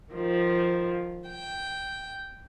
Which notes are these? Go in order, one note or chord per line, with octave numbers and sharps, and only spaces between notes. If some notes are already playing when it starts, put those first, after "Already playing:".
D#3 F3
G5